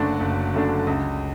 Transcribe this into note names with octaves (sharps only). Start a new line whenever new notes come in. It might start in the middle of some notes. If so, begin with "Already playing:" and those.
Already playing: F#1 F#2 D3 A3 D4 F#4
F#1
F#2 D3 A3 D4
C#2